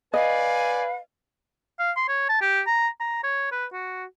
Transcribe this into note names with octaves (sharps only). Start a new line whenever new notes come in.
B4 D5 D#5 F5 G#5
F5
C6
C#5
A5
G4
A#5
A#5
C#5
B4
F#4